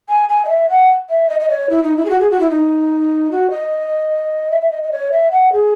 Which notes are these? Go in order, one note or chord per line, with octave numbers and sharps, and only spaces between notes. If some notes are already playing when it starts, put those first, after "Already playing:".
G#5
G#5
D#5
E5
F#5
E5
D#5
D#5
C#5
E4
D#4
E4
G#4
F#4
G#4
F#4
E4
D#4
F#4
D#5
E5
E5
D#5
D#5
C#5
E5
F#5
G#4